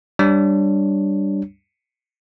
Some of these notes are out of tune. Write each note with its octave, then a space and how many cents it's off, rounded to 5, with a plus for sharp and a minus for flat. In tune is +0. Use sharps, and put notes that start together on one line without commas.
G3 +0 D4 +0 C#5 +0